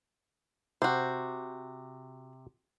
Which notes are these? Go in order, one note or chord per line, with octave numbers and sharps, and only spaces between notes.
C3 F#4 C5